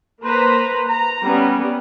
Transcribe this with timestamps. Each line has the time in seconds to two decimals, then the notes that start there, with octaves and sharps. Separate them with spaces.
0.22 A#3 B4 C5 A#5
0.86 A#5
1.22 G3 B3 C#4